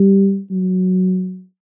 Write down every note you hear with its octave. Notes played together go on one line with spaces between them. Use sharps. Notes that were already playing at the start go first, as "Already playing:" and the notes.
Already playing: G3
F#3